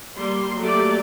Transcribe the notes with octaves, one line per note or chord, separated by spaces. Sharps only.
G3 A#3 C6
F#3 A3 A#3 G4 D5